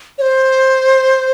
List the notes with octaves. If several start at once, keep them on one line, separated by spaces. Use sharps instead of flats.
C#5
C5